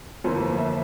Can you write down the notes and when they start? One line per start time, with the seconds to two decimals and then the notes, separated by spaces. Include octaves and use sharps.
0.24 G1 F2 E3 A#3 C5
0.58 E5